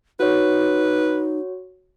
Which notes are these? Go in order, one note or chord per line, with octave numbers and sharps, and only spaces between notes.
D#4 F#4 B4 C#5